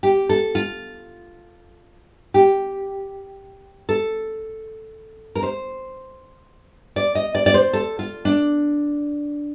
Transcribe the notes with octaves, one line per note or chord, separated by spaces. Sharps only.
G4
A4
F4
G4
A4
A#4
C5
D5
D#5
D5
D5
C5
A4
F4
D4